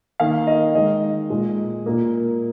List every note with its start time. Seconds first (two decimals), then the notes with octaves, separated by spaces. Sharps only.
0.20 D#3 A#3 F5
0.47 D#5
0.75 D#3 G#3 D#5
1.30 A#2 G#3
1.86 A#2 A#3